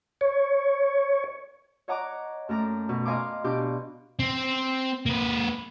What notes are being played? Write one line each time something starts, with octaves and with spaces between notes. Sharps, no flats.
C#5
C#5 D#5 F#5 A#5 D6
F#2 A3 A#5 D6
B2
D#5 F5 G#5 A#5 C6 D6
B2 D4 G4 C6 D6
C4
A#3 B4